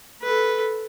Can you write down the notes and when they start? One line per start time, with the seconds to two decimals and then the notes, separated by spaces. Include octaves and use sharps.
0.22 A4 B4